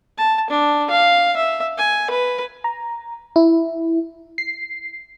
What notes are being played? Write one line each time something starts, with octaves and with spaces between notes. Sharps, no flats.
A5
D4
F5
E5
G#5
B4
A#5
E4
C7